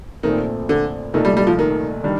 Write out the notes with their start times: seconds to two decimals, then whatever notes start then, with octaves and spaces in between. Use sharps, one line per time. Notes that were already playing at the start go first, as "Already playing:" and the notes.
0.23 A#1 A#2 D#3 A3 C4
0.69 D3
1.14 C2 A#2 D#3 A3 D#4
1.25 G3
1.37 G3
1.47 F3
1.59 D#3
2.04 D#3 G3 D4